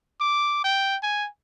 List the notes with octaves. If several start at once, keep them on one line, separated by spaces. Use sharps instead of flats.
D6
G5
G#5